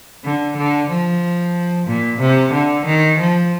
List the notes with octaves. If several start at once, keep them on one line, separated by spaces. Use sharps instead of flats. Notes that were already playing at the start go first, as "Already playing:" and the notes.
D3
D3
F3
A#2
C3
D3
D#3
F3